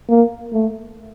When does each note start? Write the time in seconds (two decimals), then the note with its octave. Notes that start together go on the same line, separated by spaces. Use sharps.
0.09 A#3
0.53 A3